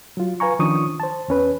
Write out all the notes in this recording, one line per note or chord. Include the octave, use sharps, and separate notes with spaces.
F#3 F4
B4 F5 G#5 A#5 C#6
D#3 F3 C#4 D4 C#6 D#6
C5 A5
E2 C#4 B4